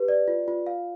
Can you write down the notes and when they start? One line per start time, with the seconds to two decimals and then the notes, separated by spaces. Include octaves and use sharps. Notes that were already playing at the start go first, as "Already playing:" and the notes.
Already playing: G4 B4
0.08 D5
0.28 F4
0.48 F4
0.67 F5